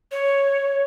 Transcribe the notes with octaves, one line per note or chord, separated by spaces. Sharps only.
C#5